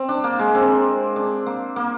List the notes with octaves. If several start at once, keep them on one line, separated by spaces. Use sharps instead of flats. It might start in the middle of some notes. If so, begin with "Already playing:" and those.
Already playing: C4
D4
A#3
G#3
C4
D4
A#3
A#3